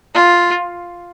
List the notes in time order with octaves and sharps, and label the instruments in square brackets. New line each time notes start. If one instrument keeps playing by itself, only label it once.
[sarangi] F4